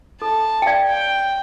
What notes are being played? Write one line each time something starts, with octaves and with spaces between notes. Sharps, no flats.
A4 A5
G5
D5 F5
G5